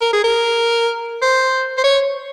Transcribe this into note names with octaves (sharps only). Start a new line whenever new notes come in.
A#4
G#4
A#4
C5
C5
C#5